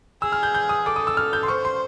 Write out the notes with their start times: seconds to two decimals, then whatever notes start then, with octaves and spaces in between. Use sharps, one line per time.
0.22 G#4 E6
0.32 F6
0.43 G6
0.55 G6
0.69 D#6
0.85 A4 D6
0.96 D#6
1.07 E6
1.17 F6
1.33 G6
1.43 C6
1.48 C5 C#6
1.65 C6